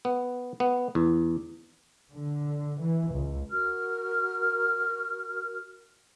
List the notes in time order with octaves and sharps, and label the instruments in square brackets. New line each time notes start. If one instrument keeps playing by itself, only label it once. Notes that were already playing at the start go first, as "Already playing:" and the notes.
[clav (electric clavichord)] B3
B3
E2
[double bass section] D3
E3
C#2
[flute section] F#4 A#4 F6